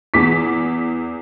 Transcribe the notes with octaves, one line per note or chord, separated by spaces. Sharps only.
E2 G#4 D6 B6